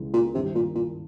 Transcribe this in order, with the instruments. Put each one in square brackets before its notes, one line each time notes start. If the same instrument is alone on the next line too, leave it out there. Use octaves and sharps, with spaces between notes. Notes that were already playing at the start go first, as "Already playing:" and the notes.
Already playing: [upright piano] C#2 C#3 E3 G#3
[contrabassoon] A#2
[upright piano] G#1 G2 E3 [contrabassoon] C3
[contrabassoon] A#2
A#2